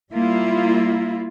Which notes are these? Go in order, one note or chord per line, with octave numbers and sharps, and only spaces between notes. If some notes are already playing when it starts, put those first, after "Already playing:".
G3 A#3 E4 F4